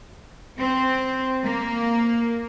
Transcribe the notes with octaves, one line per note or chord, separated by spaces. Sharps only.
C4
A#3